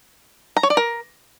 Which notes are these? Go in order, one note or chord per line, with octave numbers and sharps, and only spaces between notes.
A#5
C#5
D5
A#4